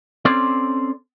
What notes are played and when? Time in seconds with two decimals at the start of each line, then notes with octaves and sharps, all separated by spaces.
0.25 C4 C#4 A4 C5 D5